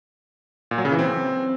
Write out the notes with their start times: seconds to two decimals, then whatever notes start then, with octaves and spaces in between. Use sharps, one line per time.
0.71 A#2
0.78 F#3
0.85 C#3
0.92 E3
0.99 C4